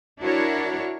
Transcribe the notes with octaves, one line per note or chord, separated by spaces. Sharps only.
D4 E4 F#4 A#4 C#5